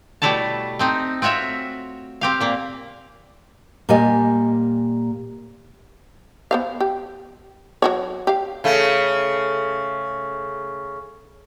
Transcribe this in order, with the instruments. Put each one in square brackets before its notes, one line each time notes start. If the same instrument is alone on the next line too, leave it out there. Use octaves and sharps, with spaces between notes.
[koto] B2 G3 A3 E4 C#5 A5
A3 C4 D#4
C4 F4 F#4 C#5 E5
C4 G4 F5
A#2 A#3
[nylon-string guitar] A#2 G3 G4 D#5 G#5
[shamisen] B3 C5 F5
G4
F#3 F#4 C#5
G4 F5
[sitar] C#3 A3